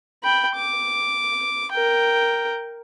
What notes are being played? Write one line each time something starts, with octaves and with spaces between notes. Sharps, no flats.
G5 B5
D6
A#4 G5